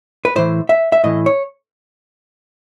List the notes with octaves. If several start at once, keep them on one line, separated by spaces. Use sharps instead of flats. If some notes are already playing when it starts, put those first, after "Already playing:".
B4
A2 E3 C5
E5
E5
A2 E3 D#5
C#5